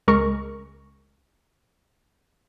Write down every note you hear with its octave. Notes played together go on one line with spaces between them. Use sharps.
C#2 G#3 A#4 C#6